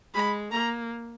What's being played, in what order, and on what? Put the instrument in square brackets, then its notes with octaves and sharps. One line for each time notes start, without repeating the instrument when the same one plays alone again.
[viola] G#3 [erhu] B5
[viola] A#3 [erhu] A#5